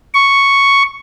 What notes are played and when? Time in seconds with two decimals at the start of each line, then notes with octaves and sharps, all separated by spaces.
0.14 C#6